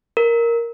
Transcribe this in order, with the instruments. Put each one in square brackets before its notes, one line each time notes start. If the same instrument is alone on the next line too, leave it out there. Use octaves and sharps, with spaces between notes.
[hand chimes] A#4